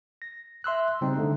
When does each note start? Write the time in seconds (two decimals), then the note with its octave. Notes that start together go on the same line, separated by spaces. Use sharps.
0.22 A#6
0.64 E5 C6 E6 F#6
1.01 C#3 G3 C4 D#4
1.16 D3 A3 D#4